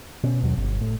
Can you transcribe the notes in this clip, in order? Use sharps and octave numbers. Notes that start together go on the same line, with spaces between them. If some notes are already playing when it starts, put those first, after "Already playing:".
B2 C#4
D#2 B2 F#3
G1
A2